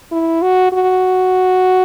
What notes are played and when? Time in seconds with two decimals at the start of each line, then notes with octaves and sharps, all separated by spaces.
0.12 E4
0.42 F#4
0.72 F#4